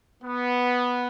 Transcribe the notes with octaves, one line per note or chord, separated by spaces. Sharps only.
B3